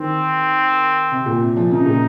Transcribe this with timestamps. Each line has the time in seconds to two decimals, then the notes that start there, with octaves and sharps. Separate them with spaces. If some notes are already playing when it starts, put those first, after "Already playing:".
Already playing: D#3 C4
1.12 C3
1.26 A#2
1.41 C3
1.56 F3
1.71 C#3 D#4
1.86 A#2